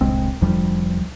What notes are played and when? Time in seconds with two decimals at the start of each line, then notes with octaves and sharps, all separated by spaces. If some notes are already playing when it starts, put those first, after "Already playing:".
0.01 D1 C2 G#3 C4
0.41 F1 D2 F3 G3